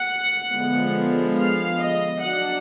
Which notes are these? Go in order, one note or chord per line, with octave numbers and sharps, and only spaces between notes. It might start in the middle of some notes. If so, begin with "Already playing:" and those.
Already playing: F#5
D3 F3 G#3 B3
F5
D#5
F#3 D4 F#5